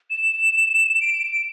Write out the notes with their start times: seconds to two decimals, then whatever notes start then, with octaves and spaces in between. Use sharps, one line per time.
0.10 E7
1.00 D7
1.23 D7